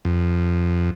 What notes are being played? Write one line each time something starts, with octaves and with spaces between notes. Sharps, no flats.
F2